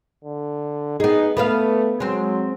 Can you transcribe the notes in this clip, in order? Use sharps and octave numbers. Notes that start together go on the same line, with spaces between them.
D3
B3 D#4 G#4
A3 B3 B4 F5
F#3 G#3 C4